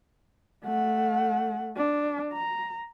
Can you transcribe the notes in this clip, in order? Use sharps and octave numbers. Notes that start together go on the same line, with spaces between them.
A3 F#5
D4
A#5